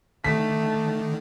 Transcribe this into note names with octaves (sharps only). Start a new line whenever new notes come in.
D3 D#3 A3 B6